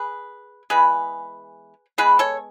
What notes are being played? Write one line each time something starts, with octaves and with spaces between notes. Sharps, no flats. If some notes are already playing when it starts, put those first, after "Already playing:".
Already playing: G#4 B4
E3 G#3 B3 G#4 B4
E3 G#3 B3 G#4 B4
A4 C#5